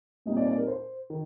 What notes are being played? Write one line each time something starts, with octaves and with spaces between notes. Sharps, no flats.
A#2 G3 C4 D#4 D#5
D5
D5
A#4
C5
D#3